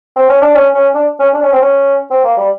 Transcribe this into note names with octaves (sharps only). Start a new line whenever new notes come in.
C4
C#4
D4
C#4
C#4
D4
C#4
D4
C#4
C4
C#4
C4
A#3
G3